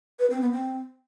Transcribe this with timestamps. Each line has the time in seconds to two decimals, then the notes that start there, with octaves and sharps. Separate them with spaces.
0.19 B4
0.30 C4
0.41 B3
0.52 C4